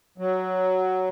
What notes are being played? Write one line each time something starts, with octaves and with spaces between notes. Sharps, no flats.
F#3